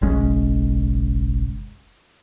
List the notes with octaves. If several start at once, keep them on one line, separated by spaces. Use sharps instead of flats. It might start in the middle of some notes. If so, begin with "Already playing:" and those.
F#1 B1 G#3 C#4